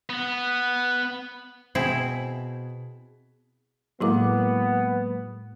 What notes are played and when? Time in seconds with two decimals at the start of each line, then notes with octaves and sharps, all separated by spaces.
0.10 B3
1.75 B2 C4 E4 G#4 G#5 B6
4.00 A2 F#3 G#3 A#3 B3 E4 D6